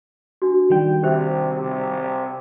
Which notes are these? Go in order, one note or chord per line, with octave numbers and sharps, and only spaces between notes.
D4 F#4
D#3 G3 G5
C3 G4 C5 E5
C3